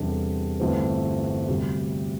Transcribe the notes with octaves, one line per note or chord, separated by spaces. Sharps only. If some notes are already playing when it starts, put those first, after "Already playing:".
Already playing: E2 C3 G3 D4 A4
G1 G2 E3 A3 C4
D2 C3 G3